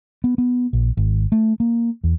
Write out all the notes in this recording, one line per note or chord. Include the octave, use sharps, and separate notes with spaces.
B3
B3
A#1
G#1
A3
A#3
E2